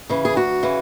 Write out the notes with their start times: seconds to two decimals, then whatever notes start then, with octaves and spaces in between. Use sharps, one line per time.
0.09 C#3 E3
0.25 G#4
0.36 D2 F#4
0.63 C#3 E3